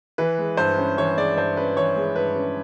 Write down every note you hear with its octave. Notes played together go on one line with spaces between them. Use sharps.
E3 B4
G#3
G2 C5
C#4
E3 C#5
G#3 D5
G2 C5
C#4 B4
E3 C#5
G#3
G2 B4
C#4